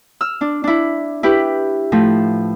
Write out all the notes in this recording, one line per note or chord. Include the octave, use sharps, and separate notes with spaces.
E6 F6
D4
D4 E4
E4 G4 B4
A2 F3 A3